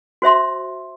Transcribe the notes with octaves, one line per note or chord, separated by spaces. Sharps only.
F#4 C5 E5 C6